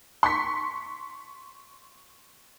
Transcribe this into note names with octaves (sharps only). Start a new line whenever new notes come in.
C6 C#6 B6